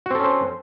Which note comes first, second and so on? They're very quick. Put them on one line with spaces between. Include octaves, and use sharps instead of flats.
F#4 C4 A4 C#4 C5